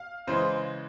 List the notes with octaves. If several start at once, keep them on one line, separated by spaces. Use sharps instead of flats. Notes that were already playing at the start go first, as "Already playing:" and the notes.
Already playing: F5
C#3 E3 G#3 C5